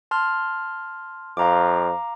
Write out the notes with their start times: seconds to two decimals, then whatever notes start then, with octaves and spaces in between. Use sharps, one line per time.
0.11 A5 C6 F6
1.37 F2 F5 A#5 D6